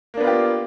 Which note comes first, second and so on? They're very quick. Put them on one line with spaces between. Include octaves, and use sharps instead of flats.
A#3 D4 B3 F4 G4